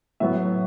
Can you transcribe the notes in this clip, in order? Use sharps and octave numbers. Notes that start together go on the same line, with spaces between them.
A2 F#3 B3 E5